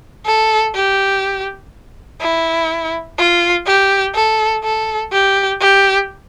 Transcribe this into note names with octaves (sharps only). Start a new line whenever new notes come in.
A4
G4
E4
F4
G4
A4
A4
G4
G4